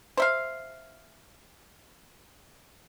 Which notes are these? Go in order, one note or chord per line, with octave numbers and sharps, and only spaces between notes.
C5 E5 F5